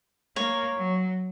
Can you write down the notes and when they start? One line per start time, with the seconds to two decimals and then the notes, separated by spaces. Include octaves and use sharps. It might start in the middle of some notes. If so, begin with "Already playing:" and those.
0.36 A#3 C#5
0.77 F#3